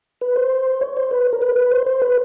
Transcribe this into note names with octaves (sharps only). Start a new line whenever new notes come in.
B4
C5
C#5
C5
B4
A#4
B4
B4
C5
C5
B4